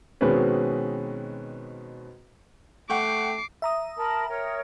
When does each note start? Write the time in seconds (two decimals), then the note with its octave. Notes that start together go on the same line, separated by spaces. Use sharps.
0.21 B2 D#3 G#3 C4 C#4 B4
2.90 A3 F#5 G5 C#6 D6 C7
3.62 E5 A#5 D#6
3.97 A#4 A5 B5
4.28 A#4 C#5 G5